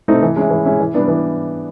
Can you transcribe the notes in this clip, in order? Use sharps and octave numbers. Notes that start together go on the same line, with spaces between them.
A3 C4 D#4
E3
G#3 C#4 E4
E3
G#3 C#4 E4
E3
G3 B3 D4
E3